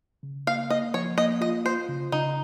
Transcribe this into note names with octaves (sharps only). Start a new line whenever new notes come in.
C#3
A#3 F5
A#3 D#5
F3 C#5
A#3 D#5
F4 D#5
F4 C5
C#3
C#3 D#4